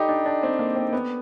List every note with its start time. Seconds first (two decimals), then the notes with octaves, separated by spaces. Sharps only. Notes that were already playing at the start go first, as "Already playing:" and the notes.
Already playing: D#4 G4 A4 D5 G5 B5 D6
0.09 D4
0.26 D4
0.43 C4
0.59 A#3
0.76 C4
0.93 B3